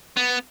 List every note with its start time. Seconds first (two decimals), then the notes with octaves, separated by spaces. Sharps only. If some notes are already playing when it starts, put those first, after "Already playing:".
0.17 B3